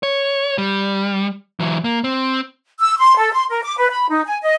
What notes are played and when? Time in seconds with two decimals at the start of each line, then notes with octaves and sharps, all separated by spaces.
0.03 C#5
0.58 G3
1.60 E3 F#3
1.84 A#3
2.04 C4
2.80 E6
2.97 C6
3.17 A4
3.32 C6
3.49 A#4
3.64 D6
3.78 B4
3.90 B5
4.09 D#4
4.25 G#5
4.41 D#5